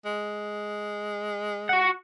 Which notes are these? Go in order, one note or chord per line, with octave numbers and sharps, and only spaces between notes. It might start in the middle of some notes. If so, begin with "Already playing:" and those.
G#3
F#4 F#5